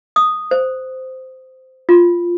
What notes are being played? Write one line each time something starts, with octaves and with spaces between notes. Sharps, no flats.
D#6
C5
F4